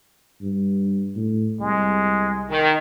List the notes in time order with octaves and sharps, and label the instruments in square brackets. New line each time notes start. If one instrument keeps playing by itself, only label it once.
[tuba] G2
A2
[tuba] C2 [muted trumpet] G#3
[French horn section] D#3